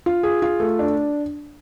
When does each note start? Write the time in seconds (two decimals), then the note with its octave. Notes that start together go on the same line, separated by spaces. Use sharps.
0.06 F4
0.23 G#4
0.42 F4
0.60 A3
0.79 D4